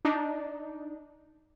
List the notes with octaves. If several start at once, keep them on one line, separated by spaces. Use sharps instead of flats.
D4 D#4